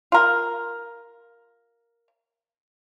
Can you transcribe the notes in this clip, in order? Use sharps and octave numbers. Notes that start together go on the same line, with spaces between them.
F4 A#4